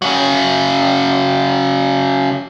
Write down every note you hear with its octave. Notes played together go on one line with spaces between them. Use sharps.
C#3 F#3